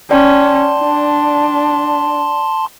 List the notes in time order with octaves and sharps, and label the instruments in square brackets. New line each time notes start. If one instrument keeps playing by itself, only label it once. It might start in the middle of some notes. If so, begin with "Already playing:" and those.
[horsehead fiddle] C#4 [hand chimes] D5 G5 [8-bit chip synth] A5 C6
[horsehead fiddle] D4